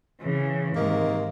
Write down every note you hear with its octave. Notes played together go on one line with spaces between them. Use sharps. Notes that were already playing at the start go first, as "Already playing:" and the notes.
C#3 E3
G#2 C3 D#3 A#3